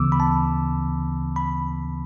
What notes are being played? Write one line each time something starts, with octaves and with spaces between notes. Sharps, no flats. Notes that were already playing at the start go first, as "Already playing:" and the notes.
Already playing: D2 C#3 E3 B3 D6 E6
B5
A5
B5